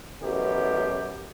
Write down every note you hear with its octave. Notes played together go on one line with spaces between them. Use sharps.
A1 F#2 B2 G4